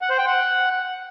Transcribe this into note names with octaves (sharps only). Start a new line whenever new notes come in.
F#5
C5
G5
F#5